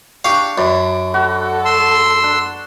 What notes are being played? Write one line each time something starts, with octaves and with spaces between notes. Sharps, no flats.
D4 G4 F5 C#6
F#2 D5 B5
F#4 A4
C6 E6
D4